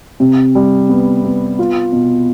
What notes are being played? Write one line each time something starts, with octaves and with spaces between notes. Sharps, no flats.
C3
G3
B3
B3
F4
B2